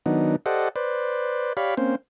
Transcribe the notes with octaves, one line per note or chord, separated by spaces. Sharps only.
D#3 F#3 B3 D4 D#4
G4 A4 C5 D5 D#5 F#5
B4 C5 D5
G4 C#5 D5 F5 B5
A#3 C4 C#4 C5